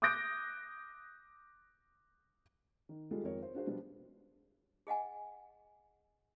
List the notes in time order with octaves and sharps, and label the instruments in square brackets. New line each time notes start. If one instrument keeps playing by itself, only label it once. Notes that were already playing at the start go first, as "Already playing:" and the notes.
[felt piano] D6 D#6 F#6 G6 A#6 D7
D#3
G3 G#3 F4 G#4 A4
G#1 F2 C4 A#4 C#5
C5
D4 F#4 G#4 C5
B2 F3 G3 B3 D4 F4
[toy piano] G#4 D#5 F#5 G#5